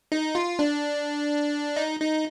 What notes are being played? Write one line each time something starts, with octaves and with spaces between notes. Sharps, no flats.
D#4
F4
D4
D#4
D#4